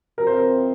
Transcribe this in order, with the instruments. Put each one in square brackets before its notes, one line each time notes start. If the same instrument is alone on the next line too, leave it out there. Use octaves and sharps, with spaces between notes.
[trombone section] C3 F3 C4 [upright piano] A#4
[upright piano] C5
A#4